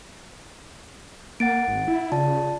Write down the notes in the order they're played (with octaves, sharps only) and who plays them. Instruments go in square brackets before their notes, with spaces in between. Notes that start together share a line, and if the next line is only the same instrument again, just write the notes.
[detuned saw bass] A#3 [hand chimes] F#5 A6 D7
[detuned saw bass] G#1
E4
[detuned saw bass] C#3 [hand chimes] F4 D5 A5